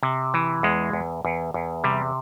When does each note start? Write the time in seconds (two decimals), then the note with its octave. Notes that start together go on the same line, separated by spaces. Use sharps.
0.03 C3
0.34 E3
0.63 E2 G#3
0.93 E2
1.25 E2
1.54 E2
1.84 C3 G3